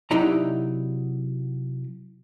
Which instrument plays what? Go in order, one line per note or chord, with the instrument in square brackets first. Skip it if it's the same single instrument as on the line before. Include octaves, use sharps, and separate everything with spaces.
[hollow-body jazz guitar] C3 F#3 D#4 E4 D5 A#5